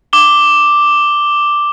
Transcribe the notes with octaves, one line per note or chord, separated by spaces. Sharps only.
D6 G7